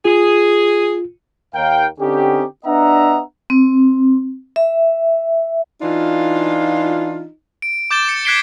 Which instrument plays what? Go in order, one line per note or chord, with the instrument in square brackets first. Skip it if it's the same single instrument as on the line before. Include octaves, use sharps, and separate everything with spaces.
[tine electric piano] F4 [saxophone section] G#4
[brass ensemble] D#2 A#4 F5 G5
D3 C4 C#4 D#4 G4
B3 D4 D#5 E5 F#5 A#5
[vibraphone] C4
E5
[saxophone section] E3 D4 F4 [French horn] D#4
[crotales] D7
D6 G6 A6 E7 G7
C#7
F#6 G#6 B6 C7 D7 G7